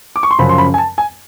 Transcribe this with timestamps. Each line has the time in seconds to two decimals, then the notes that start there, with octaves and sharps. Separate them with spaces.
0.16 D6
0.23 C#6
0.31 C6
0.39 F#2 C#3 F3 B5
0.49 C6
0.58 B5
0.74 G#5
0.78 A5
0.98 G#5